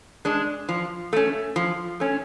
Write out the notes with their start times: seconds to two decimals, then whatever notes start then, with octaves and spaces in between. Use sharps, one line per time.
0.25 G#3 D4
0.69 F3
1.13 A3 C#4
1.56 F3
2.00 A3 C#4